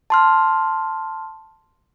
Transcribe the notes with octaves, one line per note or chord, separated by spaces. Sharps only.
A5 C6 F6